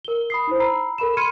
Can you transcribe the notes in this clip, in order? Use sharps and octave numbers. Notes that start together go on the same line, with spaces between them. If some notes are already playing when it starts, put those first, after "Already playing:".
A#4 G7
B5 D#6 C7
D#4 E4 C5
A#5 B5 E6 C7
A4 A#4 B5 E7
B5 C6 F6 G#6 C#7 D#7